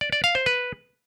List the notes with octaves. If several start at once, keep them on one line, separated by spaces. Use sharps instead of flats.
D5
D5
F5
C5
B4